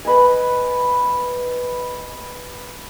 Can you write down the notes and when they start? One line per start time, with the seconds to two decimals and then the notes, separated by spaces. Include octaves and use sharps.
0.05 B4 D#5 G#5